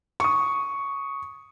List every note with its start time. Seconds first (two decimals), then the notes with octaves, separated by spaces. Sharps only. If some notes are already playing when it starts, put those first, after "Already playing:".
0.20 C#6 D#6